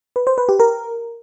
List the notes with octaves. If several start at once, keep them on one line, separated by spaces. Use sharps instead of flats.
B4
C5
B4
G4
A#4